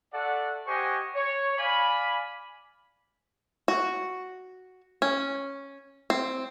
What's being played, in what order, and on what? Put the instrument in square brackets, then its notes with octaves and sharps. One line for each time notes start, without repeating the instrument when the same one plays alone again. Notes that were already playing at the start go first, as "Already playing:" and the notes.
[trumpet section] F#4 A4 D5 E5 F#5
F#4 G4 C5 D#5 G#5 C#6
C#5
D5 F5 G#5 B5
[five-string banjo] F#4
C#4
C4